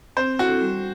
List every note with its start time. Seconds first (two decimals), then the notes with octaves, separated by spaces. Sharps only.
0.17 C4 C5
0.39 E4 F#4 A4
0.61 G3